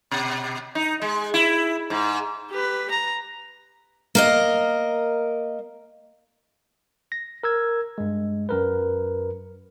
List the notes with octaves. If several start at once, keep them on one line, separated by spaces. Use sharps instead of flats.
B2
D#4
G#3
E4
G#2
G4 B4
A#5
A#3 A#4 D#5
A#6
A#4 E6 G#6
G2 G#3
F#2 A#4 B4